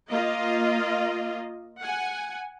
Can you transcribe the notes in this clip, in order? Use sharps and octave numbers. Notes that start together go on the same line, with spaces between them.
A#3 F4 D#5
F#5 G#5